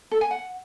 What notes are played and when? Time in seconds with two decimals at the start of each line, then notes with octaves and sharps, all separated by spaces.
0.11 A4
0.21 G#5
0.31 F#5